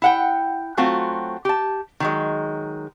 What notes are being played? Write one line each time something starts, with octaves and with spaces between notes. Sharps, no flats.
E4 F#5 G5
F#3 A3 C4 F4 F#4
G4 A5
D#3 F#3 G#3